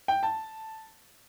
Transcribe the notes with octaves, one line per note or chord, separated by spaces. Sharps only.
G5
A5